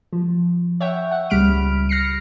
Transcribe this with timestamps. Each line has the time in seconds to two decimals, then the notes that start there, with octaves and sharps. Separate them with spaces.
0.13 F3
0.81 C#5 E5 F#5 G5
1.11 F#5
1.30 C#2 G3 B5 F6 D7
1.89 F6 A#6 C7 C#7